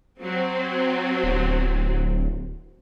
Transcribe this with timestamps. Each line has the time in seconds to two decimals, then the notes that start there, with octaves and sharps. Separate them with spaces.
0.21 F#3 C4
1.24 D1